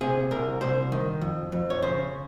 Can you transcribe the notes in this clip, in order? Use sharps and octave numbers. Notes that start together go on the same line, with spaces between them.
C3 G#4
C2 A#4
C2 C5
D#3
F2
F2
C#5
C#3 C5